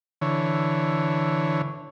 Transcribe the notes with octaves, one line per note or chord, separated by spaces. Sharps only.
D3 E3 C#5